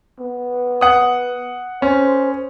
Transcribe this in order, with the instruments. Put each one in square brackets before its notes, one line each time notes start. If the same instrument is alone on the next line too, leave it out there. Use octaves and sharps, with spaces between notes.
[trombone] B3
[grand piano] F#5 D#6
[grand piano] C#4 [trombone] C5